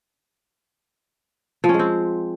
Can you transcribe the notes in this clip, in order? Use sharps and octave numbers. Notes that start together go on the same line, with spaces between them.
F3
C#4
G#3
C4